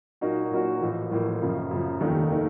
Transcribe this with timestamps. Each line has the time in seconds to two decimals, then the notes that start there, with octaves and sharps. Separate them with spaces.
0.21 A#2 F#3 A#3 D#4 F#4
0.51 A#2 F#3 A#3 D#4 F#4
0.81 A1 A2 F3 A#3
1.11 A1 A2 F3 A#3
1.41 F#2 C#3 F3
1.71 F#2 C#3 F3
2.00 F1 D#2 D#3 A3 D#4
2.31 D#3 A3 D#4